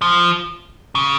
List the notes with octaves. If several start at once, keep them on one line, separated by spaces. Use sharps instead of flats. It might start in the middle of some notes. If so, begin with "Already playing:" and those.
F3
C#3